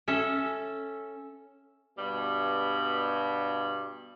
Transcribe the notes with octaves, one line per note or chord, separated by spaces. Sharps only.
C#4 A4 E5
G2 B2 G3